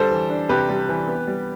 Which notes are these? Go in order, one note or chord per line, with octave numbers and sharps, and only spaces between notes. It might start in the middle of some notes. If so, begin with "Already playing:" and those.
Already playing: D3 G3 A4 C5
E3
D4
C3 G4 B4
G3
E3
B3
G3